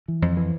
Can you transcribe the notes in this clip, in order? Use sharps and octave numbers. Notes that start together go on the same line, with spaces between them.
E3
F2
E3